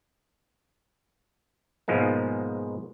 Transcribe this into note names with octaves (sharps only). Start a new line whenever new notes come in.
G#2 B2 F3 G#3 A#3